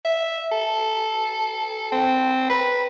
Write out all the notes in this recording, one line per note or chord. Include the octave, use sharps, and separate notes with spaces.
E5
A4
C4
B4